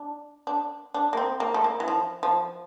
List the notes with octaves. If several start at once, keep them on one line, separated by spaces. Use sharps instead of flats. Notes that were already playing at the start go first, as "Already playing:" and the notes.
Already playing: D4
D4
D4
A#3
C4
A#3
A3
A#3
E3
F3
F3